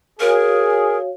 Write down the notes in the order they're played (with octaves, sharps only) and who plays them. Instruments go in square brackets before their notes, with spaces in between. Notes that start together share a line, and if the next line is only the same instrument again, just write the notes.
[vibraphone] F#4 C#5 F5 [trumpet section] G#4 [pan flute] A#4